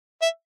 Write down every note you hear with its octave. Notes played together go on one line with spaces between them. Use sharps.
E5